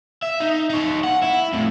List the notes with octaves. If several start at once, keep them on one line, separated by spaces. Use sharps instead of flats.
E5
D#4
D#4 C#5
F#5
E4
F2 A2